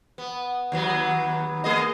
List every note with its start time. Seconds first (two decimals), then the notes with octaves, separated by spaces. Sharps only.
0.18 B3
0.72 D#2 F#3 B3
1.64 A3 G#4 D#5